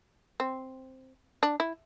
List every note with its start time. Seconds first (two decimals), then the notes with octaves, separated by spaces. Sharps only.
0.40 C4
1.43 D4
1.60 E4